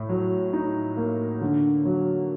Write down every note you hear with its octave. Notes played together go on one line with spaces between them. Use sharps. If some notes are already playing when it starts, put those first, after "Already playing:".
Already playing: A2
F#3
D#4
A#3
D3
F#3